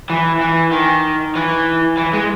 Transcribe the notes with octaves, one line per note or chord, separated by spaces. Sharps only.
E3
E3
D#3
E3
E3
G#3